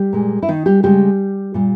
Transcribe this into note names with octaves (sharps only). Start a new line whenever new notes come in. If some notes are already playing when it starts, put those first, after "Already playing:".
Already playing: G3 G4
A#2 G#3
E4
D#3 D#4
G3 G4
C#3 G3 G#3 G4
A#2 G3